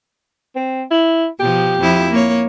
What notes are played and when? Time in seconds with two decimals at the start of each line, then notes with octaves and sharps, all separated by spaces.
0.55 C4
0.91 E4
1.40 B2 F3 G4
1.80 F2 F3 E4
2.11 A#3 C#5